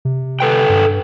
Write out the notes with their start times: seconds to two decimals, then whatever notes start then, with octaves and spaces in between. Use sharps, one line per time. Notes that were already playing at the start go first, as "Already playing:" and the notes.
0.05 C3
0.40 A4 B4 G5
0.69 G2